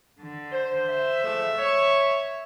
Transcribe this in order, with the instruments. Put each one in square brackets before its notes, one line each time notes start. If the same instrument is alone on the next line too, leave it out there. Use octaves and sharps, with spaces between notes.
[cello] D3
[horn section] C5
[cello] E5
[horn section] F3 G#3 A3
C#5